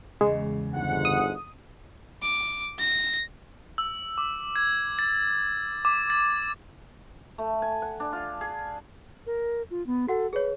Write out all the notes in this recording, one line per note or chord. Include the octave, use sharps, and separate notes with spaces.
E2 C#3 G#3
G1 G#2 F#5
D#6
D6
A#6
E6
D6
G#6
A6
D6
A6
A3
G#5
F#5
D4
F4
G#4
A#4
F4
B3
F#4 A4 F#5
G#4 B4 C#5